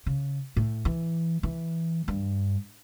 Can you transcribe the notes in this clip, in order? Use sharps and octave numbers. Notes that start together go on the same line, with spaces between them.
C#3
A2
E3
E3
G2